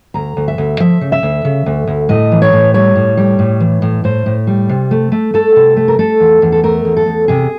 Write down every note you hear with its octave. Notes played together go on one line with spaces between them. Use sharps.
D2 A#5
D2
E5
D2
F3 E5
C#3
E5
D2
C#3
D2
D2
A2 D#5
E3
C#5
A2
G3 C#5
A2
G3
A2
E3
A2
A2 C5
A2
G3
C3
A3
A3
A3 A4
C3
A3
A#4
A3 A4
E2
E2
A4
A3 A#4
E2
A4
E2
C3 G#4